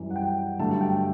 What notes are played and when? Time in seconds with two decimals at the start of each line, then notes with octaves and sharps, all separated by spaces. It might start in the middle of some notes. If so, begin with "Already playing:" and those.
Already playing: F#2 E3 G3
0.10 F#5
0.16 G5
0.59 G2 D3 F#3 A3 A5
0.81 G5